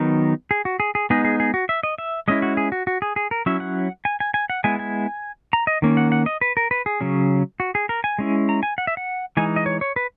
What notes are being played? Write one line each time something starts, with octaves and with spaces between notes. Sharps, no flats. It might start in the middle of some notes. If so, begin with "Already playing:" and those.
Already playing: D#3 F#3 B3 D#4 A#4
G#4
F#4
G#4
G#4
G#3 B3 D#4 G#4
G#4
G#4
F#4
E5
D#5
E5
G#3 C#4 E4 D#5
F#4
G#4
F#4
F#4
G#4
G#4
A#4
F#3 C#4 E4 E5
F#5
G#5
G#5
G#5
F#5
G#3 B3 E4 G#5
G#5
A#5
D#5
D#3 A#3 C#4
F#5
F#5
D#5
B4
A#4
B4
G#4
C#3 F#3 C#4
F#4
G#4
A#4
G#5
G#3 C#4 E4
A#5
G#5
F#5
E5
F#5
E3 G#3 D#4 G#5
D#5
C#5
C#5
B4